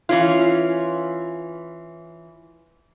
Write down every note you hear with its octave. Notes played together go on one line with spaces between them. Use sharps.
E3 C#4 F4